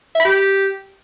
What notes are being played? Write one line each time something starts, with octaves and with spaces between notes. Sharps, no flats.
E5
B5
G4